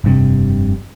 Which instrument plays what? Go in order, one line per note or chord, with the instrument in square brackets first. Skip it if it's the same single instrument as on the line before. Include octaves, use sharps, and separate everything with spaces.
[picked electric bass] F1 G2 C3